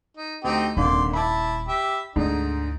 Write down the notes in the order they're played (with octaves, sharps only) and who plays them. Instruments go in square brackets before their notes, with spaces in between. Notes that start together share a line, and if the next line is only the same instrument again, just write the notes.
[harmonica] D#4
[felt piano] D2 [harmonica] C4 D#4 G4
[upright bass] D#1 [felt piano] G#1 D#2 D3 [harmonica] D5 C6
[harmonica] E4 A5 [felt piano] B5 D6
[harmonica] G4 E5
[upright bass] D2 [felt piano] G#2 D3 D4 [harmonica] D#4